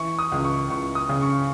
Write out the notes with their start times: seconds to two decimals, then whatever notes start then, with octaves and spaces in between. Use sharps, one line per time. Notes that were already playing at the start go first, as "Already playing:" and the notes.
Already playing: E3 C#6
0.19 D#6
0.32 C#2
0.44 C#6
0.70 C#2 C#6
0.95 D#6
1.09 C#3
1.21 C#6